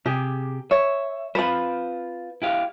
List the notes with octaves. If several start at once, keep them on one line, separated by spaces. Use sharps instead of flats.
C3 G4 G#4
C#5 E5
C4 F4 B4 C5 B5
E4 G4 F5